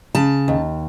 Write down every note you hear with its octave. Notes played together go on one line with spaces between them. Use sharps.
C#3 A5
D#2